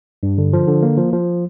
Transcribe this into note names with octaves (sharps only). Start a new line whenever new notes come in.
G2
D3
F3
D3
A#3
F3
F3